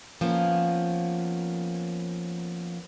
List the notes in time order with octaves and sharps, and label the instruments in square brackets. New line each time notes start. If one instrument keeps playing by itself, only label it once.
[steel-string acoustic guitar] F3 A#3 B3 C#4